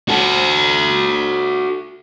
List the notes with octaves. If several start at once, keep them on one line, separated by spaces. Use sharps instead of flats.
F#4 A4